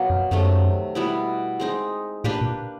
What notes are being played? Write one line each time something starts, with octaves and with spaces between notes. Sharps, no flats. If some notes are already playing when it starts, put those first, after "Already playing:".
Already playing: B2 F#3 A#3
F2
F#2 C3 D#3 F#3 A3
B2 G3 B3 E4
G#3 C4 D#4
A2 A#3 D4 G4 B4
A#2